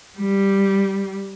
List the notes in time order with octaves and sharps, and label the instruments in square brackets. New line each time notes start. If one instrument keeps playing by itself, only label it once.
[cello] G3